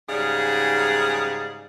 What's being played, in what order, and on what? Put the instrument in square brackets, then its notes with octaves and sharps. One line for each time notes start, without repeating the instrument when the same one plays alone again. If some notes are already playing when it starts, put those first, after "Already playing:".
[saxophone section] G#2 C#3 G3 G#4 D5 F5